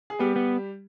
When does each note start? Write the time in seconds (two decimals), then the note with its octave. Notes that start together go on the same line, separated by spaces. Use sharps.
0.10 G#4
0.19 G3 B3 G4
0.36 B3